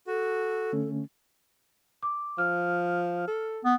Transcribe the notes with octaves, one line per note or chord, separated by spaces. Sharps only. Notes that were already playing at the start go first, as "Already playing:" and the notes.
F#4 A4
D3 A3 C#4
D6
F3 F6
A4
B3